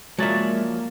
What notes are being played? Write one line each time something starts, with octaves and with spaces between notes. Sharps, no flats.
F3 F#3 G#3 A#3 D5 E5